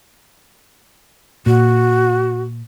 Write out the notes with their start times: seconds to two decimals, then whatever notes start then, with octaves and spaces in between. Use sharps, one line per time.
1.46 A#2 F#4